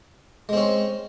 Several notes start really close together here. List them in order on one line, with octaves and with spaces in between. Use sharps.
G#3 C4 C#4